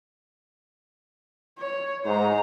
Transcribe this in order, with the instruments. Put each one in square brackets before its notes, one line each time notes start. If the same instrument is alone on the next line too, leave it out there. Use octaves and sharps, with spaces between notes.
[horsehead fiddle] C#5
[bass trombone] G#2 [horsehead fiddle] C5 A#5